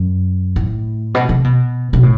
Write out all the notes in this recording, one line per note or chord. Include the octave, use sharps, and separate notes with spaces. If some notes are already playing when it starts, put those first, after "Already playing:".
Already playing: F#2
A2
B2
C3
B2
B2
A2